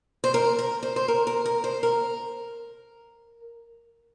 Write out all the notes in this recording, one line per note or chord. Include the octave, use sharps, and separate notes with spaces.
C5
A#4
A#4
C5
C5
A#4
A#4
A#4
C5
A#4